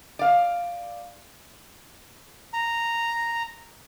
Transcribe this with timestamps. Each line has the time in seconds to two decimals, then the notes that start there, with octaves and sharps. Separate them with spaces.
0.19 D5 F5
2.53 A#5